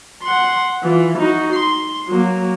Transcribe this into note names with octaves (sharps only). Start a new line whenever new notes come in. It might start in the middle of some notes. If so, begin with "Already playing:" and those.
F#5 C6
E3 F4
D#4 F#4
C6
F#3 A#3